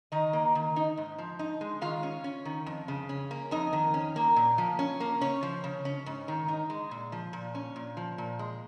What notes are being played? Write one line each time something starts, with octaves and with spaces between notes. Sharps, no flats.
D#3 D#4 D#5
A#3
D#3
D#4
G#2
F3
D#4
G#3
D#3 F4 F5
C#4
C#4
D#3
F2
C#3
C#4
A#3
F2 D#4 D#5
D#3
C#4
A#3
A#2
F3
C#4
A#3
C#3 C#4 C#5
F3
C#3
C#4
G#2
D#3
D#4
G#3
A#2
F3
A#2
C#4
A#2
F3
A#2
G#3